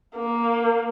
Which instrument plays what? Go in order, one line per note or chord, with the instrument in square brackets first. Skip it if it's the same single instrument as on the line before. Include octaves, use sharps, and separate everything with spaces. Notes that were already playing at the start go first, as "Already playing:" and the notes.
[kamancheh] A#3